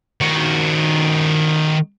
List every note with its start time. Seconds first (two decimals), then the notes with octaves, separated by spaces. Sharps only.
0.21 D#3 F#4